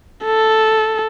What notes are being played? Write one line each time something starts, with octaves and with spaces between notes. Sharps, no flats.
A4